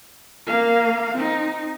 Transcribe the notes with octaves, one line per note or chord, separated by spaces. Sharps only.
A#3 F5
C4 D#4